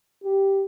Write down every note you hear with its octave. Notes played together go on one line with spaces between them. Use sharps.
G4